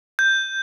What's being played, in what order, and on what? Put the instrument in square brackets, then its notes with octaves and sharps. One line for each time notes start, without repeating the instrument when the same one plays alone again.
[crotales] G6